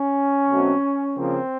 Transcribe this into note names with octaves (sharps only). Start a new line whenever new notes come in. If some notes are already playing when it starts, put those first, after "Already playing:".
Already playing: C#4
B2 F#3 A3 C4
C#3 F3 A#3 C4